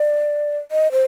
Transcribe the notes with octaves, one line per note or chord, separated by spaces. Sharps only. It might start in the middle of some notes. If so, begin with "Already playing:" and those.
Already playing: D5
D#5
C5